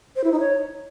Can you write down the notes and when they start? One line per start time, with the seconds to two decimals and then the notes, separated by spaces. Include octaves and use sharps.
0.16 C5
0.24 E4
0.32 D#4
0.40 C#5